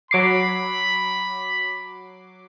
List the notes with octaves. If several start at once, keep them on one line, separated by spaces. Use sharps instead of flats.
F#3 B5 D6 C7